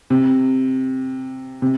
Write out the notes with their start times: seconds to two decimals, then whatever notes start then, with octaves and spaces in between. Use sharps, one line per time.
0.10 C3
1.62 C3